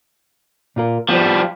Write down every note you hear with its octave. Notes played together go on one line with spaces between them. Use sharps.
A#2 F4 A#4
F3 G3 B3 C5